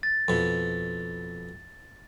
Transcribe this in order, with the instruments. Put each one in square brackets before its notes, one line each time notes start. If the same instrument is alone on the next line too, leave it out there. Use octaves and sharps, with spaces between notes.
[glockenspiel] A6
[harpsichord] F2 B2